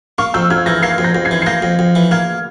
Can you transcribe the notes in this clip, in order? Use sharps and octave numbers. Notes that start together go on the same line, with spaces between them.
A#3 C#6 F6
F2 E6 G6
F2 F6 G#6
E3 G6 A#6
A#3 G#6 C7
F2
G6 A#6
F2
G#6 C7
E3
C7
A#3 G6 A#6
F2
F2
E3
A#3 F6 G#6